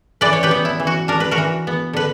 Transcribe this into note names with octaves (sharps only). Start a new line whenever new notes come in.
E3 B4 D5
C#5
G4 B4
B3
E4
E3
F#4
D4 A#4
B4
F#4 A#4
E3
B3
D3 B4